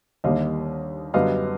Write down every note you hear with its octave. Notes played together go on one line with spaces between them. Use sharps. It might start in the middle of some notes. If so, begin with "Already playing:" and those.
D#2 D3 G3 A#3 D#5 F5
F#2 D3 G3 B3 D#5 F5